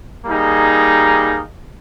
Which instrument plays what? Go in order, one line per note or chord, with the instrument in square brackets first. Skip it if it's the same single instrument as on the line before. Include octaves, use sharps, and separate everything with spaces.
[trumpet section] G3 A#3 D#4 G#4